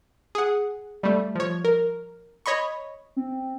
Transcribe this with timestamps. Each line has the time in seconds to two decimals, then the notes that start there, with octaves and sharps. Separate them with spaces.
0.35 G#4 F#5
1.03 G3 A3
1.35 F3 C#5
1.65 A#4
2.46 C#5 D#5 B5 C#6
3.16 C4